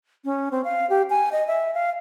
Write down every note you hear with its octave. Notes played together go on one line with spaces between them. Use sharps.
C#4
C4
F5
G4
G#5
D#5
E5
F5